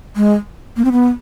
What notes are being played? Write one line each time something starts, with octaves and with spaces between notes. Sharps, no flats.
G#3
A#3
C4
B3